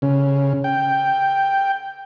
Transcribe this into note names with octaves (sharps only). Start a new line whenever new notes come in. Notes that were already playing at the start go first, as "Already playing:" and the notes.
C#3
G5